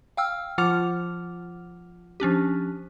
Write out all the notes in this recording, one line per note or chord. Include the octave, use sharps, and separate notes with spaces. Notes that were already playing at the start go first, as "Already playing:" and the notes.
F5 G5 E6 F6
F3 F4 F#5 D6 F6 F7
F3 C#4 D4 G4